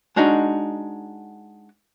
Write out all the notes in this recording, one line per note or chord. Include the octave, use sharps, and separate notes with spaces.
G#3 D4 D#4 F#4